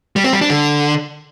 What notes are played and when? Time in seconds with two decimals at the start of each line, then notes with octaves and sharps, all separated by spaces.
0.16 G3
0.24 C4
0.33 G3
0.41 D4
0.50 D3